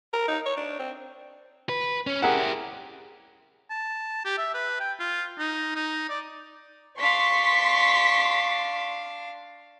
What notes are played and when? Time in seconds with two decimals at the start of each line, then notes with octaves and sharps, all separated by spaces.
0.13 A#4
0.28 D#4
0.46 C#5
0.57 D4
0.79 C4
1.69 B4
2.07 C#4
2.22 E4 G4 G#4 A#4 F#5
3.70 A5
4.25 G4
4.38 E5
4.54 B4
4.80 G5
4.99 F4
5.39 D#4
5.75 D#4
6.09 D5
6.99 D4 F5 C6 C#6 B6